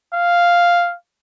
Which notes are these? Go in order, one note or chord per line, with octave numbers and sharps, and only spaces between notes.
F5